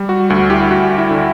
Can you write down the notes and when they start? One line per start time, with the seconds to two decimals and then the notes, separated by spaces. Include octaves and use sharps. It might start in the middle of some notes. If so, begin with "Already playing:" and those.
Already playing: G3
0.09 F#4
0.30 D2 F#4
0.50 E4 G4
0.70 D2 F#4
0.98 E4
1.11 D3